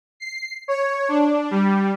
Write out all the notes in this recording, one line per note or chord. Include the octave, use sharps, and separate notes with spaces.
C7
C#5
D4
G3